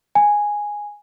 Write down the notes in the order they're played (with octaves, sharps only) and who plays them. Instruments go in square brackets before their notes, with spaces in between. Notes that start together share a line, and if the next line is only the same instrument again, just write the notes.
[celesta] G#5